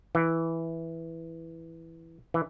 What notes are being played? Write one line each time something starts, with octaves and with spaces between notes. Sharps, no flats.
E3
E3